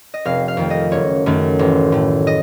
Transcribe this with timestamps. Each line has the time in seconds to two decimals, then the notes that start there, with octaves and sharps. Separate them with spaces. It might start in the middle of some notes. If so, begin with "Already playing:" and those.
0.14 D#5
0.25 F1 F5
0.48 F5
0.57 F2 D#3 A3
0.71 D#5
0.92 F#1 C#5
1.26 F#2 D#3 A3
1.59 A1
1.92 A2 A3
2.27 D#5